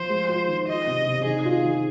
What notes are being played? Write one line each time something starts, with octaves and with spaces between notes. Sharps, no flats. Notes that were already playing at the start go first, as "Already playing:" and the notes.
Already playing: F3 C5
G#3
F4
D#3
F4 D#5
C3
C3
D#3 G#4
F4
D#3